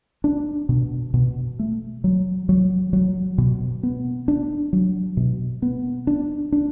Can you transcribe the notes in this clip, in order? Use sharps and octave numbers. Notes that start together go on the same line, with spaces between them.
D4
B2
B2
A3
F#3
F#3
F#3
B2
B3
D4
F#3
B2
B3
D4
D4